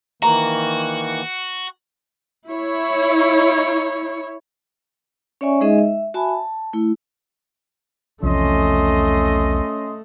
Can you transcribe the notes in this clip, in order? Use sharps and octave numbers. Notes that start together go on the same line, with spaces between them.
D#3 E3 A#3 F#4 A#5
E4 C#5
C#4 C#5 D5 E5 G#5 C#6
G#3 D#4 G#4 D#5 E5
E5
F#4 E5 G#5 A5 B5
A5
A3 E4
B1 E2 C3 F3 A3 C#4 D#5 C6